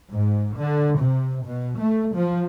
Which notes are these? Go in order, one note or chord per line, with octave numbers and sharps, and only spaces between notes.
G#2
D3
C3
B2
A3
F3